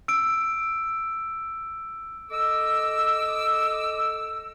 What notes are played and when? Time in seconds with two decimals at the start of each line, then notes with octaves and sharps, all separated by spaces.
0.08 E6 D7
2.30 A4 D#5 D6 E6